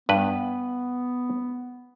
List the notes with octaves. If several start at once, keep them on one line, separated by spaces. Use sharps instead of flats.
G2 B3 B4